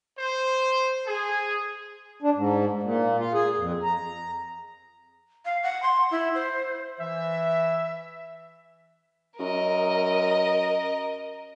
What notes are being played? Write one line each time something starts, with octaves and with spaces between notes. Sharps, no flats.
C5
G#4
D4
G#2
A#2
F4
G#4
F2
A#5
F5
F#5
C6
E4
C5
E3 E5
F#2 A#4 D#5